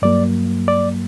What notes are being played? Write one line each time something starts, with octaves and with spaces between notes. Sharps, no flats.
G2 F#3 A#3 D5
D5